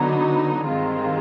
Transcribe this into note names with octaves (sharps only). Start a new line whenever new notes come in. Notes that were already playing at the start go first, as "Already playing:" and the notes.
Already playing: D3 F#3 B3 D#4
G2 D#3 G#3 C4 F4